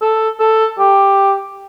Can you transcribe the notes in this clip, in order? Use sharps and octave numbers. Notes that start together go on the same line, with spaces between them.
A4
A4
G4